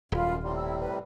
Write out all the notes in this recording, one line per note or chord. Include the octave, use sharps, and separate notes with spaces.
D#1 F#2 F4 B5
A2 C3 G3 C6
E4 E6
B4